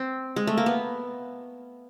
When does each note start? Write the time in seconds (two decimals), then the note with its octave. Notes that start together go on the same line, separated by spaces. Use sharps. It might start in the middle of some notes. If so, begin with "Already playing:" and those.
Already playing: C4
0.36 G#3
0.47 A3
0.58 A#3
0.66 B3